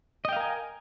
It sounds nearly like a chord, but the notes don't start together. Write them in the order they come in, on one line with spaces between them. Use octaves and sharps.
D#5 G5 F5 A#4 G#5